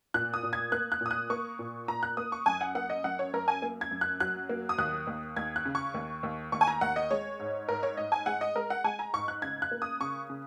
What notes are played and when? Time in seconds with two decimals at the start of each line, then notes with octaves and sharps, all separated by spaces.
0.14 A#2 F#6
0.34 D#6
0.43 A#2
0.53 G#6
0.72 A#3 F#6
0.92 F#6
1.01 A#2 D#6
1.11 F#6
1.30 A#3 C#6
1.59 A#2
1.88 A#2 A#5
2.03 F#6
2.17 A#3 D#6
2.32 C#6
2.46 F#2 G#5
2.61 F#5
2.75 A#3 F#5
2.90 D#5
3.04 F#2 F#5
3.19 C#5
3.33 F#2 A#4
3.48 G#5
3.62 A#3
3.81 G#6
3.91 F#2
4.01 F#6
4.20 F#3 F#6
4.49 A#3
4.69 D#6
4.78 D#2 F#6
5.07 D#2
5.36 D#2 G#6
5.56 F#6
5.66 C#3
5.75 C#6
5.94 D#2
6.23 D#2
6.52 D#2 C#6
6.61 G#5
6.67 A#5
6.81 D#2 F#5
6.96 D#5
7.11 G#3 C#5
7.40 G#2
7.69 G#2 A#4
7.83 C#5
7.97 G#2 D#5
8.12 G#5
8.26 G#3 F#5
8.41 D#5
8.55 G#3 A#4
8.70 F#5
8.84 G#3 G#5
8.99 A#5
9.14 G#2 C#6
9.28 F#6
9.42 C#3 G#6
9.62 F#6
9.71 A#3
9.82 D#6
10.01 C#3 C#6
10.30 C#3